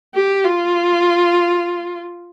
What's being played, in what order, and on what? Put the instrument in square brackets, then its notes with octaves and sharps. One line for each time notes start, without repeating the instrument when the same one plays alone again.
[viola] G4
F4